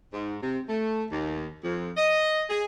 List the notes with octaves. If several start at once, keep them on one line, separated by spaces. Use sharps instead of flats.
G#2
C3
A3
D#2
F2
D#5
G#4